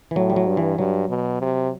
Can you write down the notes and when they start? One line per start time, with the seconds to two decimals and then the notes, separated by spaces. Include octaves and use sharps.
0.11 E3
0.16 A2 F#3
0.30 G3
0.36 F#3
0.47 G2
0.57 E3
0.78 G2 F#3
1.09 B2
1.41 C3